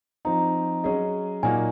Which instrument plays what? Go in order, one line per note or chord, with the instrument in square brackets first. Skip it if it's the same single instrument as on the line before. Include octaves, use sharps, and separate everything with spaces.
[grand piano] F3 C4 D#4 [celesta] A#5
[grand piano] F#3 C#4 G#4 D#5
[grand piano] A#2 F#3 A#3 D#4 F#4 [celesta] G#5